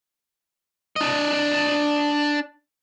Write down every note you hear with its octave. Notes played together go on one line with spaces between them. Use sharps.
D4 D#5